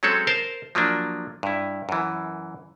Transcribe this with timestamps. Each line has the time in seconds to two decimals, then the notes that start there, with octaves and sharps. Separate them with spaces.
0.03 F#3 G#3 C4 C#4 A4 C#5
0.27 A#4 C5 A5
0.75 F3 F#3 A#3 D4
1.43 G2 E4
1.89 F#2 E3